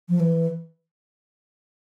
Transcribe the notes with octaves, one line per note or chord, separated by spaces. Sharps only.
F3
E3